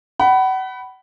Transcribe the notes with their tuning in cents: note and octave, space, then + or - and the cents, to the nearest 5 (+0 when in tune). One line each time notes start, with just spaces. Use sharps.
F#5 +35 B5 +0